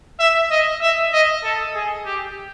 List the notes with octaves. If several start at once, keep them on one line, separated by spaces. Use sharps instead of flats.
E5
D#5
E5
D#5
A4
G#4
G4